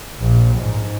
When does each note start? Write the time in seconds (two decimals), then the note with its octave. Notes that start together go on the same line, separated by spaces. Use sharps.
0.19 A#1
0.55 G#2